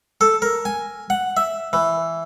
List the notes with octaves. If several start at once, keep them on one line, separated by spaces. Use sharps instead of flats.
A4
A#4
G#5
F#5
E5
E3